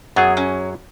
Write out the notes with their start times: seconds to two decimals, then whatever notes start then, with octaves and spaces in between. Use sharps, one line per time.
0.16 F#2 F#3 B3 G#4
0.37 C#4